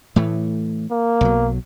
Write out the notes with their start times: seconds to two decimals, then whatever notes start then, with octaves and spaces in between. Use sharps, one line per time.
0.16 A2 E3 A3
0.91 A#3
1.21 B1 F#3